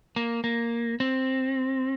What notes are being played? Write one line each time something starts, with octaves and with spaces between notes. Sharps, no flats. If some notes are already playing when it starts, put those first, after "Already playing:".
A#3
A#3
C4